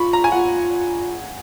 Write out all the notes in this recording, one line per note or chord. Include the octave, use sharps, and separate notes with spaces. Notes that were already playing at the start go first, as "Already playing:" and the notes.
Already playing: F4 B5 C#6
A#5
G#5
F4 F#5